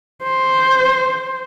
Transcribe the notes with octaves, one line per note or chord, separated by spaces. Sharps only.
C5